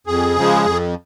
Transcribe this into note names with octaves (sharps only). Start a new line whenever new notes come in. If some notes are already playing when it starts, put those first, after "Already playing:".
F2 G#4
C#3 F3 G#3
F2